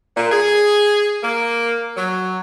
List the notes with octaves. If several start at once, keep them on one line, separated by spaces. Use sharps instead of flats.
A#2
G#4
A#3
F#3